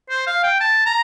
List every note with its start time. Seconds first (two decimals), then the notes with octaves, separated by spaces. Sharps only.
0.09 C5
0.27 F5
0.43 G5
0.60 A5
0.86 A#5